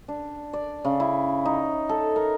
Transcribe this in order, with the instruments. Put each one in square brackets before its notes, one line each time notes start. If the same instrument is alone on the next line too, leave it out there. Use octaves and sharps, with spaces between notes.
[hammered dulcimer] D4
D5
C#3
E4
D#4
A4
A#4